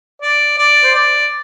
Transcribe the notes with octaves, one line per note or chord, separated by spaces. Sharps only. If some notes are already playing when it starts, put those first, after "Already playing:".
D5
D5
C5
D5